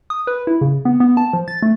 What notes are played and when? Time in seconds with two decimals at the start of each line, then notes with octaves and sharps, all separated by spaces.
0.10 D#6
0.27 B4
0.47 E4
0.61 C#3
0.85 B3
1.00 B3
1.17 A5
1.33 F3
1.48 A6
1.62 A3